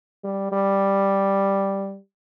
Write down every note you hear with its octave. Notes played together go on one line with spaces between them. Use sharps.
G3
G3